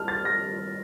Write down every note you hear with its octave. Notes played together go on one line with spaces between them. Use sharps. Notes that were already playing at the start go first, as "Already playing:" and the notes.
Already playing: G3 A5 F6
A6
G3 A#6